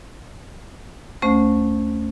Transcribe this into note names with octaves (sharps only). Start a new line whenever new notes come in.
D2 A3 C#4 C5